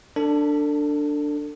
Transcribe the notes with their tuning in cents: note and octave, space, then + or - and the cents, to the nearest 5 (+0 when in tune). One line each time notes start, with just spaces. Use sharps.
D4 +0 A4 +30